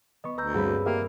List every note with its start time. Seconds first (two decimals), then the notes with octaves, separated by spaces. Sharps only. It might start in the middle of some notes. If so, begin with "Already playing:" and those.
0.24 B3 D#5 C#6
0.38 D2 B4 A#5 E6 G6
0.54 G2 C4 F#4 G#4 B4 C#5
0.86 A#3 G4 A#4 D5 E5 F5